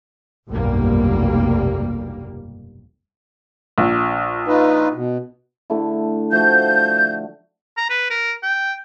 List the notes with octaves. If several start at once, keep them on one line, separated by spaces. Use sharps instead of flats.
F1 B1 G2 G3 A#3
A#1
D#4 F4 B4
B2
D3 A3 E4
F3 A3 F#4 G6
A#5
B4
A#4
G5